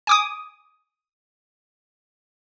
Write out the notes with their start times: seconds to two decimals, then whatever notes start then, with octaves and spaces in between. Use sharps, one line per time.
0.07 G#5 D6 D#6